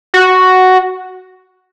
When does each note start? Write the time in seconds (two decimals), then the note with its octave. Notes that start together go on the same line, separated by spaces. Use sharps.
0.14 F#4